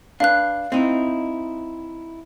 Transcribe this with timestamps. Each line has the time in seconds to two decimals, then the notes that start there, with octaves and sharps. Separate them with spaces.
0.20 D4 B4 F5 F#6
0.72 C4 D#4 E4